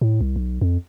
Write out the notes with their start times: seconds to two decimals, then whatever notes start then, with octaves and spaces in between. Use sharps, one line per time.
0.01 A2
0.21 C2
0.36 B1
0.61 F2